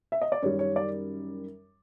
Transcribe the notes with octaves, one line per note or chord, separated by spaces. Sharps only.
E5
D#5
D5
F#2 D#3 G3 C#5
C#5
D5